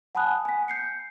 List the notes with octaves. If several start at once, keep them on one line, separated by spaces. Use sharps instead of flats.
F#5 G#5 A5 B5 D#6 F#6
G#5 B6
G6 C7 C#7